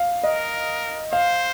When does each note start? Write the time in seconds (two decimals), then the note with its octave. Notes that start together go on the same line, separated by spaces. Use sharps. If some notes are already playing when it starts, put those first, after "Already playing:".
Already playing: F5
0.23 A#4 D#5
1.12 C5 F5